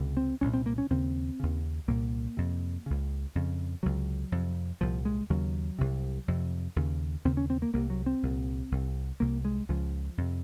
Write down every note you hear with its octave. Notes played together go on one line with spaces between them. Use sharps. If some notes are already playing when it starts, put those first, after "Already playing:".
Already playing: C#2 C3
C4
C2 A#2 C#4
C4
A#3
C#4
D#2 C#3 C4
D#2 C#3
C2 A#2 A#3
F2 C3
C#2 C#3
F2 C#3
C#2 C3 F#3
F2 C3
C2 A#2 F3
G#3
D#2 C#3 F#3
C2 C3
F2 C3
D#2 C#3
D#2 C#3 C4
C#4
C4
A#3
C2 C3 A#3
F#3
C4
C2 A#2
C2 C3
C2 C3 A#3
G#3
C#2 C#3 F3
F2 C3